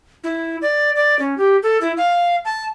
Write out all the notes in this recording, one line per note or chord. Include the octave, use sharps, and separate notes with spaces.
E4
D5
D5
C#4
G4
A4
E4
F5
A5